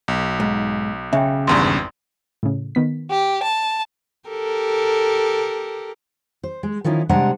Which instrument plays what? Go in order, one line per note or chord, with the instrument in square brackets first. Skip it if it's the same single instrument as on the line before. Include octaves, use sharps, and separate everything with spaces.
[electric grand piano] B1
[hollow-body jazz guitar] G#2
[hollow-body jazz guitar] C#3 [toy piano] E5 G5
[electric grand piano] G#1 E2 G2 [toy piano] C6
[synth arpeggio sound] A2 C#3
D#3 B3 B6
[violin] G4
A5
[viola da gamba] G4 A4 A#4
[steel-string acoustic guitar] C5
G#3
D#3 F3 C#4 D#4 E4
C3 G3 G#3 D4 F#5 A#5